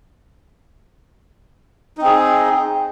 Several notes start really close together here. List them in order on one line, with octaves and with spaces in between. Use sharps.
D#4 C4 G#4